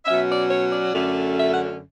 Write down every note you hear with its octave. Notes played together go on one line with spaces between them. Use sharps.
B2 F#3 C#4 E5
D5
C#5
D5
F#2 D3 A3 C#4
E5
F#5